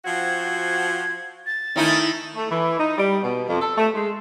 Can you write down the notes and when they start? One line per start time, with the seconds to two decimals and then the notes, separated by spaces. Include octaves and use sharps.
0.05 F3 C4 F#4 G#6
1.46 A6
1.76 D#3 A3 C#4 D#4 E4
2.35 A3
2.51 E3
2.79 D#4
2.98 G3
3.22 B2
3.48 F2
3.61 A4
3.78 A3
3.94 G#3